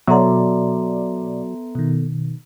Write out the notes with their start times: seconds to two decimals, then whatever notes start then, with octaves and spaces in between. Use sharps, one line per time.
0.07 B2 F#3 B3 A4 D5 E5 A#5 C6
1.75 B2 D#3